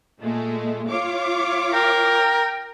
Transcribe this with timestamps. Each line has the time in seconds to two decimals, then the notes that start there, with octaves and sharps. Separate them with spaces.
0.20 A#2 G#3 A3
0.89 F4 C#5 D6
1.73 A#4 G5